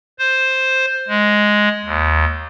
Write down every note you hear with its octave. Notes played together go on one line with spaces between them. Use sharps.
C5
G#3
D#2